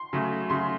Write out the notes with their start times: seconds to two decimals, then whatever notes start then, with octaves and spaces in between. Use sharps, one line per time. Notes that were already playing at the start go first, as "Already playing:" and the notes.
Already playing: C6
0.13 C#3 F#3 A3
0.50 C#3 F#3 A3 C6